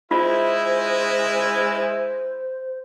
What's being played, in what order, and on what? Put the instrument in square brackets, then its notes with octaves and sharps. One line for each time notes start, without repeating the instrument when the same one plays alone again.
[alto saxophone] G#3 [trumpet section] E4 [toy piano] F4 [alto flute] C5